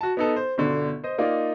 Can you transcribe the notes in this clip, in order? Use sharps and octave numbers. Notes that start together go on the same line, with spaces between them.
F#4 A5
B3 D#4 A4
C5
G1 B2 D3
C5 D#5
A#3 D#4 F4 D5